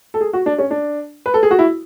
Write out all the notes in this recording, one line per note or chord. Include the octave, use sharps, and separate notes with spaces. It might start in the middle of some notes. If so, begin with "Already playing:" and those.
A4
G#4
F#4
D4
C#4
D4
B4
A4
G#4
F#4
E4